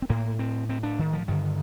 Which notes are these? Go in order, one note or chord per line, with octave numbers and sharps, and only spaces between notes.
C4
A2 A#3
C4
C4
D4
D#3
F3
G2 D3 D#3